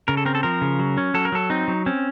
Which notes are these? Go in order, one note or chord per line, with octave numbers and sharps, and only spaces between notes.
C#3 A#4
A4
C4 A#4
A4
F3 A#4
C#3
F#3
C#4
F#3 A4
A#4
F#3 A4
C4 D#4
F#3
C4 C#4